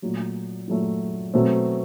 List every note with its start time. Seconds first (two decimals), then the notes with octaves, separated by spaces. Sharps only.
0.02 A#2 F#3 A3
0.68 A#2 F#3 A3
1.34 B2 F#3 A3 C4